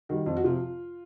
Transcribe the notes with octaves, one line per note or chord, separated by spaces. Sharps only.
D#3 G3 F#4
F2 F4
F#4
C3 F3 F4